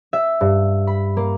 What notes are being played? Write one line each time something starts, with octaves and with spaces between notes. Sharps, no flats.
E5
G2
B5
A#3